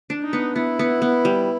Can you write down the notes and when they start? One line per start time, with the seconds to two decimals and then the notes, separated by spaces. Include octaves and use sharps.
0.10 D4
0.22 D#4
0.33 B3
0.56 B3 E4
0.79 B3
1.02 B3
1.25 G3